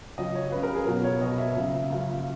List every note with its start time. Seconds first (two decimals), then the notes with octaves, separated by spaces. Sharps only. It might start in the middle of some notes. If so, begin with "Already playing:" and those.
0.18 C#2 C#3 F#3 D#5
0.35 C#5
0.52 C#2 C#3 F#3 B4
0.63 A#4
0.75 G#4
0.87 B2 F#3 B3 A#4
1.04 C#5
1.21 B2 F#3 B3 D#5
1.38 E5
1.55 C#2 C#3 F#3 A#3
1.90 C#2 C#3 F#3 A#3